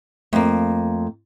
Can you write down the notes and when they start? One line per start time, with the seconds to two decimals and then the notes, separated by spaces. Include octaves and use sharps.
0.33 F2 A3 A#3